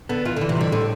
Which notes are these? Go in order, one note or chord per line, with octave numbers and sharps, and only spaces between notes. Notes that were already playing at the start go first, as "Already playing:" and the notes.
D3 B3
E3 F4
D3 E3
C3
D3 G3
A2 D3